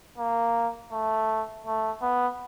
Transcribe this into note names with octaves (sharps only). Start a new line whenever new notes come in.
A#3
A3
A3
B3